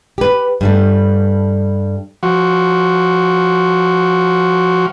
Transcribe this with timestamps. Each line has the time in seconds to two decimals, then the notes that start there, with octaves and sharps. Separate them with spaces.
0.18 G4 B4
0.61 G2 G3 A3
2.23 F3 F#4